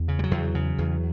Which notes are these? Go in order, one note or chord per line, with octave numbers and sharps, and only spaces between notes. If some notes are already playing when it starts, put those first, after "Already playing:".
Already playing: E2
C#3
G3
F#3
E2
C#3
E2